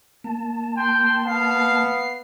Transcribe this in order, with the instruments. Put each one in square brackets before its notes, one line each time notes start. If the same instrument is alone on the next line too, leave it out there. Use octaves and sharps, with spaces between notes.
[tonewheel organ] A#3 A5
[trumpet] G5 [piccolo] C6
[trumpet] B3 [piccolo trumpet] F5 [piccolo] C7